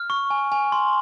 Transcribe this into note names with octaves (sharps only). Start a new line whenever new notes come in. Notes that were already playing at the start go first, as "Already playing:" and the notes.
Already playing: F6
C#6
G#5
G#5
C6